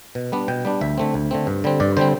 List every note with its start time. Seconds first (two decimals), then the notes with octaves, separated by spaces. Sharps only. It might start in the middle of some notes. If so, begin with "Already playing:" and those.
0.15 B2
0.32 G3 B3 D4
0.48 B2 G5
0.65 G3 B3 D4
0.81 D2 E5
0.98 D3 A3 C4
1.14 D2
1.31 D3 A3 C4
1.47 G2
1.64 D3 G3 C4
1.80 G2 D5
1.97 D3 G3 C4 C5